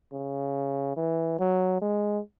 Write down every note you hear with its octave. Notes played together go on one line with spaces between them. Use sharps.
C#3
E3
F#3
G#3